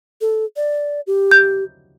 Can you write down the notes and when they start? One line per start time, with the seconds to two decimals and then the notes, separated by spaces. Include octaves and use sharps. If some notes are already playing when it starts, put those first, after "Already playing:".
0.21 A4
0.56 D5
1.07 G4
1.31 G6